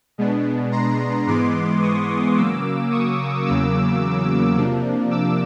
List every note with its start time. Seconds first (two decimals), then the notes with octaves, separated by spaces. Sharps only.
0.18 B2 G#3 B3 D4
0.72 A#5 C6
1.27 G#2 E3 G#3 B3 C6 D6
1.82 C#6 D#6
2.36 C#3 F#3 A#3 D6 E6
2.91 C#6 D#6
3.46 E2 C#3 F#3 A#3 D6 E6
4.56 C3 F3 A#3 D4
5.11 D6 E6